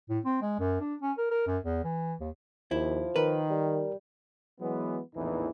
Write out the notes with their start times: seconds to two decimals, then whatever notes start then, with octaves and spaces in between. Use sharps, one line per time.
0.09 A2
0.25 C4
0.42 G#3
0.59 F#2
0.80 D4
1.02 C#4
1.18 A#4
1.31 A#4
1.47 F#2
1.64 E2
1.84 E3
2.20 D#2
2.71 D#2 F3 E4
3.16 D#3 A#4 B4
3.50 G3
4.61 E3 F#3 G#3 B3
5.15 A#1 E2 A2 E3 D#4